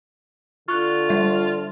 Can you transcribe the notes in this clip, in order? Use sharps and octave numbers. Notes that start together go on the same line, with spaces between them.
D3 F4 C#6 F#6
G3 E5